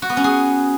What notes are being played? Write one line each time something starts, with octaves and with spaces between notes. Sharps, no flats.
F#4
B3
C#4
G#4